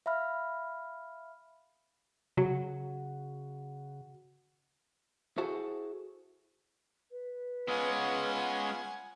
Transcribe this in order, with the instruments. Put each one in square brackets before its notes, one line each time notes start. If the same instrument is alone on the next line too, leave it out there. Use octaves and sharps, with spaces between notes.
[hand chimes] E5 F5 B5 F6
[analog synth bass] C#3 [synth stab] F#3 [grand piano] F#4
[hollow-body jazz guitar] E4 F#4 G#4 A4 C5 F#5
[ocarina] B4
[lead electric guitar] G#3 C#4 [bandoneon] B3 F4 B5 [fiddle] F#5 G#5